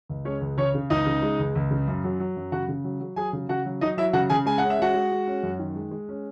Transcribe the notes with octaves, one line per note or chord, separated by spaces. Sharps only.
C#2
G#3 C#4 C#5
C#2
C#3 C#4 C#5
C#3
C#2 D#4 D#5
C#3
G#3
C#2
C#2
C#3
F#2
F#3
F#3
F#2
C#3 F#4 F#5
C#3
F#3
F#3
F#3 G#4 G#5
C#3
C#3 F#4 F#5
F#3
F#3 D#4 D#5
F#3 E4 E5
C#3 F#4 F#5
C#3 G#4 G#5
G#3 G#5
F#5
C#4
E5
G#3 F#4 F#5
G#3
G#3
C#4
F#2
D#3
G#3
G#3
C#4